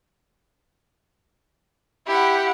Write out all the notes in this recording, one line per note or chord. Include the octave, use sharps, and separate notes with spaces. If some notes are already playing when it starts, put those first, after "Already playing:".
E4 G4 F#5